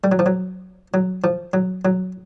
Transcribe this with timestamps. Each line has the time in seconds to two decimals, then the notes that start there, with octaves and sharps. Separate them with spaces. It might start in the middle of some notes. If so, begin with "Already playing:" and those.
0.04 G3
0.12 F#3
0.19 F3
0.26 F#3
0.94 F#3
1.24 F3
1.53 F#3
1.85 F#3